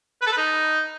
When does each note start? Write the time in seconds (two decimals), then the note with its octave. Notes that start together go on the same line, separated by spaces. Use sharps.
0.21 B4
0.27 A4
0.32 B4
0.37 D#4